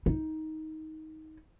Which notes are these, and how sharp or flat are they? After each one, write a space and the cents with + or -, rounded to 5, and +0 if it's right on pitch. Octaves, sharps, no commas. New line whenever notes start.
D#4 +15